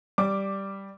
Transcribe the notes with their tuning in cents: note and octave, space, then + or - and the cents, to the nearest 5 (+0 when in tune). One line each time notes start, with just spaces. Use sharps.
G3 +0 D6 +0